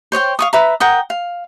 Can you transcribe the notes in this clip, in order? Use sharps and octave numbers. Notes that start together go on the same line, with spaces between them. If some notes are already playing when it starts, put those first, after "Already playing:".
C5 C#5 D#5 G5
F5 C#6 D#6
B4 E5 A#5
A#4 F#5 G5 D#6
F5